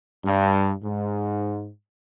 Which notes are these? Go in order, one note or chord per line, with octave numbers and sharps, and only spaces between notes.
G2
G#2